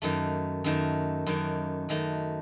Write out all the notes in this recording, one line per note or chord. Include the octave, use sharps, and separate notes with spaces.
F#2 D#3 A3
F#2 D#3 A3
F#2 D#3 A3
F#2 D#3 A3